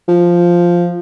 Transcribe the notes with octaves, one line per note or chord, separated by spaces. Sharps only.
F3